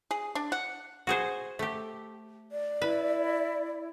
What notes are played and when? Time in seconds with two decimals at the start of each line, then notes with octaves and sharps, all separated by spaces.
0.11 G#4
0.35 D4
0.52 F#5
1.07 F#4 G#4 C5
1.59 A3 G4
2.52 D5
2.82 E4 B4